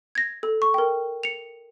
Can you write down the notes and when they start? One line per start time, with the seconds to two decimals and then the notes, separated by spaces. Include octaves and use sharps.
0.15 G#6 A#6
0.43 A4
0.62 C#6
0.74 A#4 G5
1.23 C#7 F7